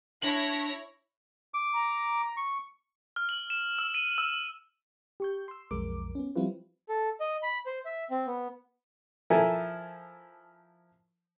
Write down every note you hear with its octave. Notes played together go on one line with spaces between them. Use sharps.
D4 E4 C#5 A#6 F#7
D6
A#5
C#6
F6
F#7
E7
E6
D#7
E6
G4 C#6 G6
C6 E6
B1 F2 G#3 A#4 D6
B3 C#4
F3 G3 C4 E4 F4 B4
A4
D#5
B5
C5
E5
C4
B3
F3 E4 A4 A#4 G#5